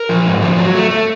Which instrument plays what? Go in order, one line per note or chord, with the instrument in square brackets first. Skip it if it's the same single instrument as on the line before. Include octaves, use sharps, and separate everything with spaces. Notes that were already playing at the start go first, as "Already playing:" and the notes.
Already playing: [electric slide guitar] A#4
F3
G#2
F3
F#3
A3
A3